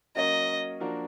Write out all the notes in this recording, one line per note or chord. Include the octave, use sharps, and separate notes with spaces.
F#3 A#3 C#4 F#4 A#4 D#5
F3 A#3 D4 F#4 A#4